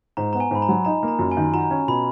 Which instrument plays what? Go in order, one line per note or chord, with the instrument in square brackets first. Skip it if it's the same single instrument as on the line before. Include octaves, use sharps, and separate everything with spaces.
[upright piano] G#2 [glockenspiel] A#5
[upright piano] B3 [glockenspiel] A#5
[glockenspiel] G#5
[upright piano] G#2 [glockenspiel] B5
[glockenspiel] A#5
[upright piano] F#3
[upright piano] D#4 [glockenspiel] A#5
[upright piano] A#3
[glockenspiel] A#5
[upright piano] F#2
[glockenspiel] G#5
[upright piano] D#3
[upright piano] F#4 [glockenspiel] A#5
[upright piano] C#4
[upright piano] B2 [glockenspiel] B5